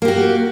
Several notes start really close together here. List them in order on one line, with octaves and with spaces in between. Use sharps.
A#3 G4 F#4